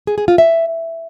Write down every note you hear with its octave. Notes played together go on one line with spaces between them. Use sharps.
G#4
G#4
F4
E5